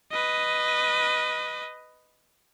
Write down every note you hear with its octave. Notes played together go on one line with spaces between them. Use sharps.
B4 D#5